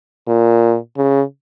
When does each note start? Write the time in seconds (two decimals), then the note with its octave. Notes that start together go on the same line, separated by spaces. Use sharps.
0.28 A#2
0.97 C#3